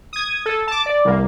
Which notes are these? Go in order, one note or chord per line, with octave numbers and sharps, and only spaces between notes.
D#6 G#6
A4
A5 D6
D5
C2 A#3